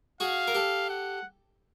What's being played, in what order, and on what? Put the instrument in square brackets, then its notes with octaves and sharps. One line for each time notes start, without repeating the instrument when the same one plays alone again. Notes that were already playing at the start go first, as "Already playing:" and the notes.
[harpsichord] F#4 G#4 [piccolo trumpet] F5
[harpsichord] A#4
G4 A4
[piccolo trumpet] F#5